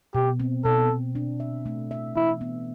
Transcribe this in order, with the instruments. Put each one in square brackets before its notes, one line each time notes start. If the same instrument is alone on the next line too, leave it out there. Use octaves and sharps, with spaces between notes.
[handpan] B2 [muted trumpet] G4
[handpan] C4
[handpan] B2 [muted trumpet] A4
[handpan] B2
D4
E5
A3
E5
[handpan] E3 [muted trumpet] E4
[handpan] B3